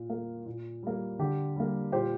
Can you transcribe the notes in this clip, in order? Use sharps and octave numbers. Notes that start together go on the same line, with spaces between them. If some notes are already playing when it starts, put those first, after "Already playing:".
Already playing: A#2
A#3
A#2
G3 A#3
D3 G4
G3 A#3
A#2 G4 C5